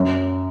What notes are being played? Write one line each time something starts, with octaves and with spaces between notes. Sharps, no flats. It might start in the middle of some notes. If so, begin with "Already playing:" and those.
Already playing: F#2